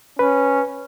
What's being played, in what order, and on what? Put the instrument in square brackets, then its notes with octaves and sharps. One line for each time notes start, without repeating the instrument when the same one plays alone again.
[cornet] C#4 [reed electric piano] B4